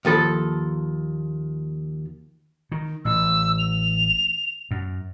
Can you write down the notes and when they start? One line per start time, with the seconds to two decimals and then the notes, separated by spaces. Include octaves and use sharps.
0.05 D#2 F3 A4 B5
2.72 D#3
3.05 A1 E6
3.59 F7
4.71 F#2